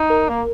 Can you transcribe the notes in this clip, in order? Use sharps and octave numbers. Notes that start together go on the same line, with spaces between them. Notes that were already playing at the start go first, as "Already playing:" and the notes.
Already playing: D#4
A#4
A#3 A#4